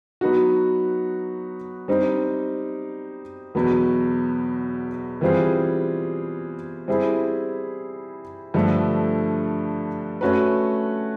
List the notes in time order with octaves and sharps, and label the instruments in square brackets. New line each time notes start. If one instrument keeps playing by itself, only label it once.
[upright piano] F#3 B3 D#4 F#4
G3 C4 D#4
E2 B2 F#3 B3
E3 G3 C4 F4 G#4
G3 C4 E4 G#4
G2 D3 F3 A3
A3 C#4 F#4 B4